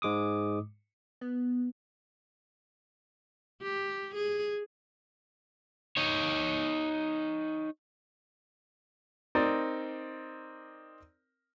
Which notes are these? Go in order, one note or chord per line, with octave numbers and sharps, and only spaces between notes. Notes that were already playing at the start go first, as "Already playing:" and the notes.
G#2 G#3 D6 D#6
B3
G4
G#4
D#4 C#5
C4 D#4 A#4 D5